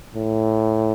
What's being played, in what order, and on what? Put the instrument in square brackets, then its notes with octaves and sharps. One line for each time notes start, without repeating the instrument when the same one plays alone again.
[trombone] A2